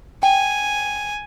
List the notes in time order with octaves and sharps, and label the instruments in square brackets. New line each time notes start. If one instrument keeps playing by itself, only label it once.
[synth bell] G5 [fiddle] G#5